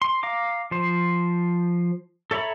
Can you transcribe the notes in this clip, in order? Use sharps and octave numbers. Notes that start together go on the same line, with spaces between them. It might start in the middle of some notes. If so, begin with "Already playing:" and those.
C6
F5 A#5 D6
F3 C5
A4 C#5 E5 A#5 B5